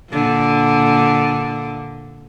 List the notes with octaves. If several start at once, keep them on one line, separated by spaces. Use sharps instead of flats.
A#2 D3